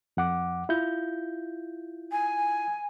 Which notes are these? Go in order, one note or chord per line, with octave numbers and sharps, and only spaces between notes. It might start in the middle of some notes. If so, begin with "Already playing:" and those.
F2 F#5 D6
E4 F4 G6
G#5